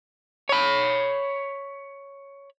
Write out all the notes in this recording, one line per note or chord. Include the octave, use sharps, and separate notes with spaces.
C#5 B5